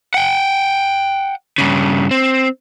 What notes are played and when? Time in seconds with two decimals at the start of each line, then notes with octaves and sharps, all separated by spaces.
0.14 F#5 G5
1.58 G2 C#3
2.11 C4